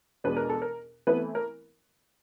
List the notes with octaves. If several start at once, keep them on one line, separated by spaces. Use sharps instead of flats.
E2 B2 G#3 B3 D4 B4
A#4
A4
A#4
E3 A3 B3 C4 E4 B4
A#4